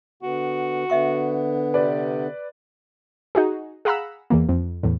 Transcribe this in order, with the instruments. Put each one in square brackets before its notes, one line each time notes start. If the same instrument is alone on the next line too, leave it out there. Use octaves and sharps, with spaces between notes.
[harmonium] D3 B3 [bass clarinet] F#4
[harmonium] D3 B3 [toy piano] D#5 E5 C#6
[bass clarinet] C3 [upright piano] B4 D5
[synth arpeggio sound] D#4 F#4 G#4
G#4 F5 F#5 A#5 B5 E6
E2 E3 A#3
F2
E2 A2